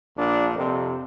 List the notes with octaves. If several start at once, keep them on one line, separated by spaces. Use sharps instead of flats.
A#1 A#2 D4
F2 C3 C4